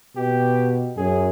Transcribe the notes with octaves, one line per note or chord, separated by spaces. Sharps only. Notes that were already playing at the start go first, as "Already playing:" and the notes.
B2 G4
F#2 G#4